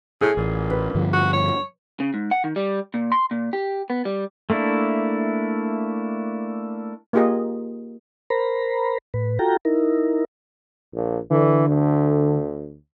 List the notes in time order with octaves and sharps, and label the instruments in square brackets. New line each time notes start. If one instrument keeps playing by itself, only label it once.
[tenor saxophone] A2 [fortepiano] G#4
[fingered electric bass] A1 [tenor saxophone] A#2
[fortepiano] B4
[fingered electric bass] G2 D3 F3
[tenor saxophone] F#4
C#5
[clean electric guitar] C#3
G#2
F#5
D#3
G3
A#2
C6
A#2
G4
B3
G3
[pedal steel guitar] A3 A#3 D4 E4
[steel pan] A#3 D#4 F4 G4 G#4 D#5
[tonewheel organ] A#4 C5 A#5 B5
A2 B4
F4 F#4 A4 G5 A#5
D#4 E4 A#4
[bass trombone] A#1
[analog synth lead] D3 [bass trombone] E3
[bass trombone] D2